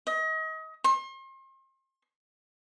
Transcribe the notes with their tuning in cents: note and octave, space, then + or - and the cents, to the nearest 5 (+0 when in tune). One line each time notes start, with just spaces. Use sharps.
D#5 +35
C6 +40